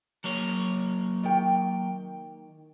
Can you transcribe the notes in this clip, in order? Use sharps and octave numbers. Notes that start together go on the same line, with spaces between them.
F#3 A#3 C#5
D#3 G5